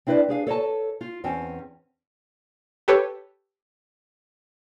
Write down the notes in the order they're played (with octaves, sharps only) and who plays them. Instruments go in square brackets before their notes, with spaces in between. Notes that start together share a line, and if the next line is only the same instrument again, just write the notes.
[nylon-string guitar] C4 D4 E4 B4 C5 D5
D4 G#4 F5
A4 C#5 D#5 A5
F4
E2 C4 C#4 A5
[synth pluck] G4 A4 B4 C#5